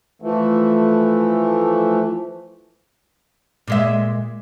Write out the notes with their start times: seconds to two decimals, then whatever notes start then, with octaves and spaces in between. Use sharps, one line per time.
0.22 E3 F3 A3
3.67 A#2 G#3 E5